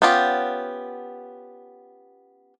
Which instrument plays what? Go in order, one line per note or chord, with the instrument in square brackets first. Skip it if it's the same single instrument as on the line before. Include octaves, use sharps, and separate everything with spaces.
[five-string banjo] B3 C#4 F4 G4